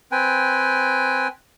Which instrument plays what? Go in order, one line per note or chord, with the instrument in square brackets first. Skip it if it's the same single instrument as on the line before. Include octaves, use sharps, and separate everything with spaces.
[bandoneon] C4 B4 G5 G#5